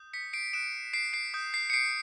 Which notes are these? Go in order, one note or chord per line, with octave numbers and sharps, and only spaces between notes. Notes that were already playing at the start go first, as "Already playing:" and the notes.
Already playing: D#6 G6
B6 C#7
C7 D7
D#6 F#6 D7 E7
C7 D7
C7 D7
D#6 G6
C7
C#7
C7 D7